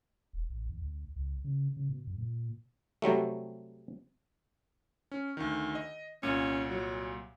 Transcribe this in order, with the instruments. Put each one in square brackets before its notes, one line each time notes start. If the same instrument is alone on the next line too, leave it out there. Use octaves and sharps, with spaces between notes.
[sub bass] E1
A1
E2
D2
C#2
C#3
C#3
B2
F#2
A#2
[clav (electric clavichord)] C3 F#3 G3 A3
[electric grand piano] C#4
D2 D#3
D#5
[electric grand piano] C2 A#2 C#7 [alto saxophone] C#4
[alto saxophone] F#3